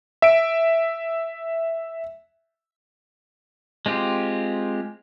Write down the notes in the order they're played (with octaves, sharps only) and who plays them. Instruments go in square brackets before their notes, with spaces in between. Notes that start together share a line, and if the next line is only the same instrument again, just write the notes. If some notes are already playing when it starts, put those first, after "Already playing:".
[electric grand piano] E5 D7
[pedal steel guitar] G#3 C4 F4 G4